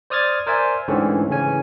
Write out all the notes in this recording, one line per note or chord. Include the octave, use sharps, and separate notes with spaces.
C5 D5 D#6 F6 G#6 A6
A#4 C5 D5 E5 G#5
G#2 D3 E3 A3 C4 C#4
C#3 E3 C#4 G#5